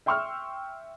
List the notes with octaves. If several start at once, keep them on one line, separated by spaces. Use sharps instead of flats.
E5 G5 C6 C#6 E6 F6